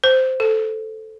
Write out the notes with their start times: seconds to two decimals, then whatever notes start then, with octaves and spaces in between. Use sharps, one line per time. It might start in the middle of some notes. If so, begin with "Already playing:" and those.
0.04 C5
0.40 A4